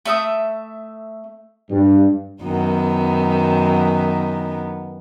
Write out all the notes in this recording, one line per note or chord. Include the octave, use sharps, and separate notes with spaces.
A3 E5 D#6
G2
F#2 D#3 B3